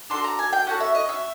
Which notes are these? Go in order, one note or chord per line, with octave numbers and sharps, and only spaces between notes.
D4 F#4 A4 C6
A#5
G#5
G5
C#4 F#4 A4 F#5
E5
D#5
E5